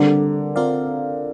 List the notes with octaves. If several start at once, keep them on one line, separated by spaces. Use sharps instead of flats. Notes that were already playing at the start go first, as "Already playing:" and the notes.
Already playing: D3 G3 C4 A#4 D5
C4 F4 A#4 D5 F5